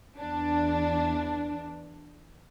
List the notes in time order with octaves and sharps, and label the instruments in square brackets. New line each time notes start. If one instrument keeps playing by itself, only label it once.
[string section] E2 D4